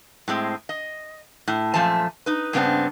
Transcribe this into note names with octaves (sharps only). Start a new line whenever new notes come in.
A2 G#3 C4
D#5
A2
F#2 A#2 F3 A3 G#5 A5
D#4 B4
G2 C#3 A3 B3 C4 D4